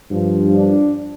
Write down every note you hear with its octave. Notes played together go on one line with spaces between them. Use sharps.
G2 F3
D4